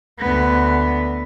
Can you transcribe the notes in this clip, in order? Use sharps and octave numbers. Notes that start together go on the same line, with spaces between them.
D2 B3